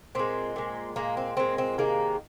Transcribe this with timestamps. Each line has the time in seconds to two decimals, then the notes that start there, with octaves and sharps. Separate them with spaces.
0.15 A#2 G#3 C4
0.56 A#2 G#3
0.96 A#2 G#3 A#3
1.17 C4
1.37 A#2 G#3 C4
1.58 C4
1.78 C3 D#3 G#3 A#3